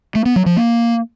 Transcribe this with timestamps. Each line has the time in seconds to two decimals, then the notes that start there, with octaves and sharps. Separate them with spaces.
0.15 A3
0.26 B3
0.36 F#3
0.46 F3
0.57 A#3